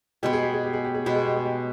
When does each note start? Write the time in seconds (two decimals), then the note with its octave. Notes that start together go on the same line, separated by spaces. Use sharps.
0.23 B2 G#3 B3 G4
0.33 G#4
0.43 G4
0.53 G#4
0.64 G4
0.73 G#4
0.85 G4
0.94 G#4
1.05 B2 G#3 B3 G4
1.15 G#4
1.25 G4
1.35 G#4
1.45 G4